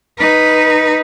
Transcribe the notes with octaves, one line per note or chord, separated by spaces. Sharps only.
D#4 B4